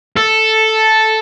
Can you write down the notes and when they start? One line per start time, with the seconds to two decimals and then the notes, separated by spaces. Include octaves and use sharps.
0.17 A4